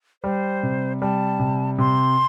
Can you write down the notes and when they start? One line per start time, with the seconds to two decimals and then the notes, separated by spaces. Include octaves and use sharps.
0.23 G3 C5
0.63 C3
1.01 G3 A5
1.40 C3
1.78 C3 C6